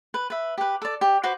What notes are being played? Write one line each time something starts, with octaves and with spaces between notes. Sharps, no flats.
B4
B4 E5
G4 B4
A4 D5
G4
F#4 B4 C5 D6